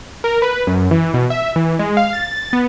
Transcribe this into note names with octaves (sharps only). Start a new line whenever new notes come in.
A#4
B4
F#2
E3
B2
E5
E3
G#3
F5
A6
B3